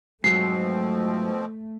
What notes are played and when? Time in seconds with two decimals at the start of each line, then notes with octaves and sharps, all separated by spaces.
0.24 G#2 B2 F3 F#3 A3 C4 C7